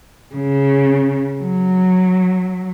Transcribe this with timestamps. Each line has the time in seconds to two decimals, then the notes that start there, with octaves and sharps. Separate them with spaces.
0.35 C#3
1.41 F#3